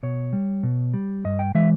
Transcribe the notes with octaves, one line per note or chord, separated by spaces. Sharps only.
B2 C#5
G3
B2
G3
G2 D#5
G5
E3 G#3 E5